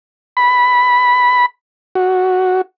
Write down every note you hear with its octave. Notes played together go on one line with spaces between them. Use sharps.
B5
F#4